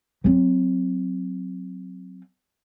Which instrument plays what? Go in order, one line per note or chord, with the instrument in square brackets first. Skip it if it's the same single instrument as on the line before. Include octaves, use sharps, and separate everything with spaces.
[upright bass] F#3 C4